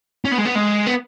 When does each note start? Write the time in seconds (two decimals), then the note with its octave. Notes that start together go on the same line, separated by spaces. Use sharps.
0.25 C#4
0.32 B3
0.38 G#3
0.45 B3
0.55 G#3
0.86 B3